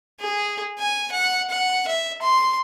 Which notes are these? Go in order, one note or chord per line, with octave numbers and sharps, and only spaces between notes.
G#4
G#5
F#5
F#5
E5
C6